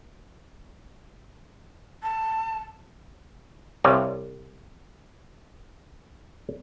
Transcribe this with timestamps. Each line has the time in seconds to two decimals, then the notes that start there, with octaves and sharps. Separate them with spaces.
2.03 A5
3.84 C2 C3 G3 C#5 F5